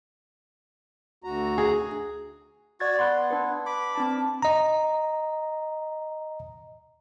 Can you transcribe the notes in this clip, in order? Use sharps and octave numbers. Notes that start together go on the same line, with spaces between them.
D2 F#4 A#5
G#4
F#4 D5 G#6 A6
B3 C6 F#6
D4 B4
B5 D6
C4 D4 A5
D#5 A#5